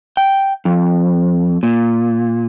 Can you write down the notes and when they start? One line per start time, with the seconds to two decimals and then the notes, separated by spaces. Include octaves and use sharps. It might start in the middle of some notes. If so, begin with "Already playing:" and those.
0.17 G5
0.65 F2
1.63 A#2